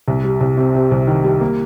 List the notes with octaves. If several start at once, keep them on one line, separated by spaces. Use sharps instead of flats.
C2
G3
C2
C3
C3
C2
D#3
G3
A#3